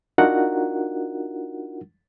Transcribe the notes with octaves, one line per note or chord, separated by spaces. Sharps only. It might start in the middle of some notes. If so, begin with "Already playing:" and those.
D4 D#4 F4 F#4 A#4 F#5